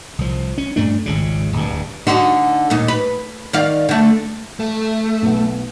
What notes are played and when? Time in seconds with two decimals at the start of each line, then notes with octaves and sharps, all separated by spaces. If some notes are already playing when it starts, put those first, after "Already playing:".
0.18 C2 F3
0.58 C#4
0.76 G2 A3 D4
1.06 G#1 C#2 C#3
1.53 D1 G2
2.07 D3 D#4 F#4
2.70 D#2 A#2 D#4
2.88 B4
3.53 D#3 D5 F5
3.89 D3 A3
4.60 A3
5.22 B1 B3